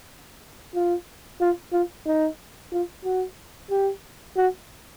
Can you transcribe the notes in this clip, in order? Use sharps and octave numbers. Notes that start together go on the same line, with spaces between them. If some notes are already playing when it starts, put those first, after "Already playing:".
F4
F4
F4
D#4
F4
F#4
G4
F#4